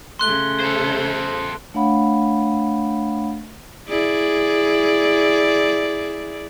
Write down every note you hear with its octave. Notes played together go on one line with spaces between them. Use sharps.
C#3 A3 C6 F#6 G7
A4 C5
A3 D4 C#5 F5 F#5 B5
E4 G#4 D5